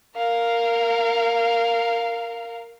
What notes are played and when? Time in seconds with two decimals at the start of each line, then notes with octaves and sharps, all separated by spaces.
0.16 A#4 F5